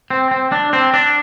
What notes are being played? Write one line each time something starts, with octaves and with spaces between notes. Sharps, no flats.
C4
C4
D4
C4
D4